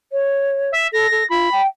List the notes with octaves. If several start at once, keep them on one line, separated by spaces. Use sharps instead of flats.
C#5
E5
A4 A#6
A4
F4 B5
G5